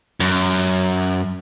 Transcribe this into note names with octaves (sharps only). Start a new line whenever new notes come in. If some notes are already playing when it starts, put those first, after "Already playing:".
F#2